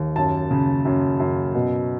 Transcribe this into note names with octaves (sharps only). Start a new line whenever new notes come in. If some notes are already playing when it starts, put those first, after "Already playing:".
Already playing: D#2
F#2 A5
C#3
F#2
F#2
B2